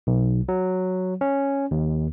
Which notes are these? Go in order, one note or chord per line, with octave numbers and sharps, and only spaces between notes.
B1
F#3
C#4
D#2